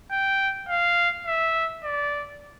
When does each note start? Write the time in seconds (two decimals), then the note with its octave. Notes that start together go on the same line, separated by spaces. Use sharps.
0.11 G5
0.69 F5
1.26 E5
1.84 D5